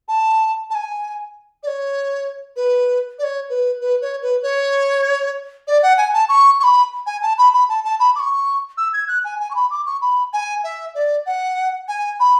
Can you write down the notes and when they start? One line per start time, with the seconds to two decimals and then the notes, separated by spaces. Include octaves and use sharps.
0.08 A5
0.70 A5
0.75 G#5
1.63 D5
1.67 C#5
2.56 B4
3.18 D5
3.23 C#5
3.49 B4
3.81 B4
4.01 C#5
4.22 B4
4.42 C#5
5.67 D5
5.82 F#5
5.97 G#5
6.13 A5
6.29 C#6
6.60 C#6
6.63 B5
7.06 G#5
7.22 A5
7.38 B5
7.53 B5
7.69 A5
7.84 A5
7.99 B5
8.16 D6
8.19 C#6
8.77 E6
8.93 G#6
9.08 F#6
9.24 G#5
9.40 G#5
9.50 C#6
9.55 B5
9.71 D6
9.86 C#6
10.01 B5
10.33 G#5
10.64 E5
10.95 D5
11.26 F#5
11.88 G#5
12.20 B5